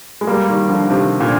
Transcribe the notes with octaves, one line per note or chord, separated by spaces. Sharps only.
G#3
G3 A#3
D#3 G3
D3 F3
C3 D#3
A#2 D3